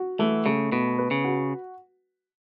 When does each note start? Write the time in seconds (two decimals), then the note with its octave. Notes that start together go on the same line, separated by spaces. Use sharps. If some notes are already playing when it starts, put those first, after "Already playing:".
Already playing: F#4
0.19 E3 A3
0.46 C#3 A3
0.72 B2 B3
0.98 B4
1.11 C#3
1.24 F#4